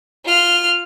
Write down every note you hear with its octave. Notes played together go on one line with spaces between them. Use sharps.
F4 F6